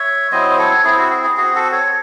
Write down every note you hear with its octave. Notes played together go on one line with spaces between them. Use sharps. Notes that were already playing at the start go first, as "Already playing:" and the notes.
Already playing: C#5 E5
F#3 C4 E4 C5 D#5
C5
A4 C#5
C4 E4 G#4
F#4
G#4
G#4
C4 F#4 G#4
F#4 A4
A4 C#5